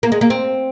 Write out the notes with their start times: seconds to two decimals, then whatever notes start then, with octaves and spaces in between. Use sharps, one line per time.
0.03 A#3
0.12 G#3
0.21 A#3
0.30 C4